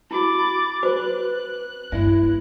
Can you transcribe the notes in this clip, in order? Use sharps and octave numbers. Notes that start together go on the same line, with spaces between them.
E4 F#4 B5 D6 A6
F#4 B4 C5 D6 F#6
G2 A#3 E4 E5